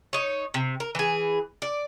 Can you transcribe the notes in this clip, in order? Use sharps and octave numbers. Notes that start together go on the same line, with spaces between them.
D#4 C#5
C3
A#4
E3 G#4
D5